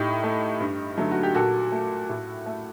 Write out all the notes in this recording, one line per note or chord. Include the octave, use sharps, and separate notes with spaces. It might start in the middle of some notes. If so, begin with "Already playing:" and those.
Already playing: A2 D#4 G4
A3
G2
D3 F#3 A3
F#4
G4
A#2 F#4 A4
A3
A2
A3